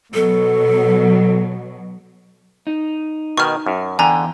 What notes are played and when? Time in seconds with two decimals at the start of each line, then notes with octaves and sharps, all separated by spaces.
0.14 B2 F#3 A4
2.67 D#4
3.37 B2 D#3 C#6 F6
3.66 F#2
3.99 E2 D3 G5 G#5 A#5